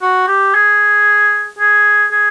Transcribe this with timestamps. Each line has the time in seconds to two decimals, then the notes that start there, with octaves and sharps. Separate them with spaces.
0.02 F#4
0.28 G4
0.54 G#4
1.59 G#4
2.11 G#4